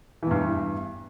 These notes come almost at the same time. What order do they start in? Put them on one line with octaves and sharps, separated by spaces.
E3 E2 G2